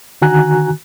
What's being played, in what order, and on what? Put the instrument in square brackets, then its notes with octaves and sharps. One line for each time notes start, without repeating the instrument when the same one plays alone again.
[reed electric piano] D3 D#3 F#4 G#5 A#5 F#6